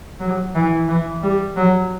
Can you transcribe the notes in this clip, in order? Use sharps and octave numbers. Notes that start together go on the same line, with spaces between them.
F#3
E3
E3
G3
F#3